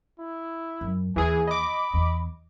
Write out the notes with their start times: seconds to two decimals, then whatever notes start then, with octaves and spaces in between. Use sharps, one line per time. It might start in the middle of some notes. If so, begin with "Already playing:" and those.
0.19 E4
0.81 F#2
1.16 D#2 E3 G#4 G#5
1.47 D#5 B5 D6
1.94 E2